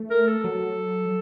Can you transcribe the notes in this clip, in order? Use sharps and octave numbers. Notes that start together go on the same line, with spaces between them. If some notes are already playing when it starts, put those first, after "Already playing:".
Already playing: A3
A#4
A4
F#3